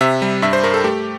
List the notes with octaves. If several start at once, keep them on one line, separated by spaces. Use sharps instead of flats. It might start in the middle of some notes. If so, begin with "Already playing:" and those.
C3 E5
G3
G2 E5
C5
G2 A#4
A4
A3 G4